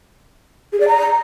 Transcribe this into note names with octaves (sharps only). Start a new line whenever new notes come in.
G#4
D5
A#5